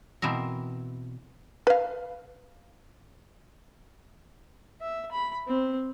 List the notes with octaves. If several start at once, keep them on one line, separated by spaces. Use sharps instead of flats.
B2 E3 C4 A#4
B4 F5
E5
B5
C4